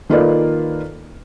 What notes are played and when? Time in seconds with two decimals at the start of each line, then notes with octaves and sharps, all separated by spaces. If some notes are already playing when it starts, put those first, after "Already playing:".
0.10 D#3 A#3 F4 A4 B4 D5